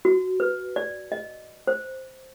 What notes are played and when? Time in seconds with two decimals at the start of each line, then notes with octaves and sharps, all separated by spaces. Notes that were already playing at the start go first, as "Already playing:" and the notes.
0.05 F#4
0.40 B4
0.76 D5
1.12 D#5
1.67 C5